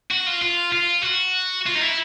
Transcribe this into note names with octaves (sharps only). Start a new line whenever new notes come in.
F#4
F4
F4
F4
F#4
F4
D#4
E4